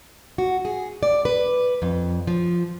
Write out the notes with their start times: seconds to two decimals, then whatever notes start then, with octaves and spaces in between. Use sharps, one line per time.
0.38 F#4
0.65 G#4
1.03 D5
1.25 B4
1.82 F2
2.27 F3